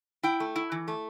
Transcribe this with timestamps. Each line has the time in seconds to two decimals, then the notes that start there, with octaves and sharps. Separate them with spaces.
0.23 E4 G5
0.40 A3
0.56 E4
0.72 E3
0.88 A3